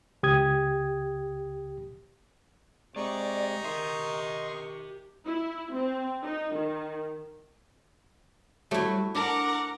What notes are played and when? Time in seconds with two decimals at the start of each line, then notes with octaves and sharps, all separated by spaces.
0.23 C#2 G4 D#6 G#6
2.96 C3 G#3 D#4 D5 C#6
3.64 D#3 G4 D#5 E5 C6
5.26 E4
5.73 C4
6.23 D#4
6.55 D#3
8.71 F#3 G3 A3 E4
9.15 D4 A#4 F#5 D6